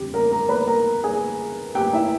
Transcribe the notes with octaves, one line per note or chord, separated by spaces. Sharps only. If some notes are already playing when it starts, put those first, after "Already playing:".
Already playing: E2 C#3 G3 G4
A#4 A#5
A#4 A#5
B4 B5
A#4 A#5
G#4 G#5
G4 G5
E4 E5